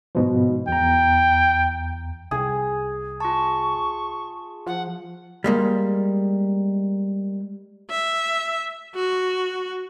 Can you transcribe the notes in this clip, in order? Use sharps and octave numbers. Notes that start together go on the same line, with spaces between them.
G#2 B2 F3
E2 G5 A#5
C2 G#4
F4 A5 C#6
F3 F#5
G3 G#3 A#3
E5
F#4